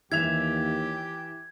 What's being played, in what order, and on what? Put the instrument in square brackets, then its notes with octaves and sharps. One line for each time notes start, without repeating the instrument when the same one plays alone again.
[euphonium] D#2 [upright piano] E3 E5 F7 [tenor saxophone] G4 [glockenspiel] G#6